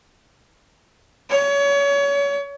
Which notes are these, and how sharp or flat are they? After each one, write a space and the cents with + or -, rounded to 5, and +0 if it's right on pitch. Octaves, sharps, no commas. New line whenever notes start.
C#5 +30